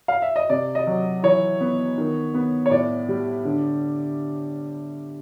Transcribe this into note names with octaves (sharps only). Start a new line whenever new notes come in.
F5
E5
D#5
C3 D5
D#5
F#3
E3 C#5
B3
D#3
B3
C#5
A2 D5
G3
D3